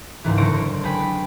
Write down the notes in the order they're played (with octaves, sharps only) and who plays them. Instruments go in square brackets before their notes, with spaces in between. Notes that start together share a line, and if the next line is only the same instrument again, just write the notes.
[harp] F#1 C#2 G#2 E3
F#1 D3 C5 C#6 A#6 D7
G#3 D4 G#4 B4 G5 B5